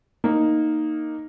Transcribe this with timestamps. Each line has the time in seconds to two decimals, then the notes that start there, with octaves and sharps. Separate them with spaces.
0.24 A#3 D#4